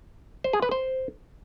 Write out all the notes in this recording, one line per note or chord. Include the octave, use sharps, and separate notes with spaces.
C5
G#4
B4
C5